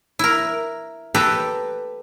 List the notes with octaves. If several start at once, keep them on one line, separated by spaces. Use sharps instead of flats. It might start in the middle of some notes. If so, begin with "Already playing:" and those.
E4 A#4
G4 A4 B4 A#5